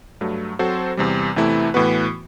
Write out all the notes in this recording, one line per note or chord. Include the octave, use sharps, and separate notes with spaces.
G2 F#3 A3
F#3 C4 F#4 A4 C5
E2 C3 G3
E2 C3 E3 A3 E4
A2 E3 B3 F#4 B4